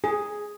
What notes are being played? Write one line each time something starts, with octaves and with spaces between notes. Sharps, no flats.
G#4